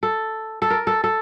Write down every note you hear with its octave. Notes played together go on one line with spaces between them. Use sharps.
A4
A4
A#4
A4
A4